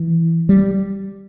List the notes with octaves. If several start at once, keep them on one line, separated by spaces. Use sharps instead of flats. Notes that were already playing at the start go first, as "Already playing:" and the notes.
Already playing: E3
G3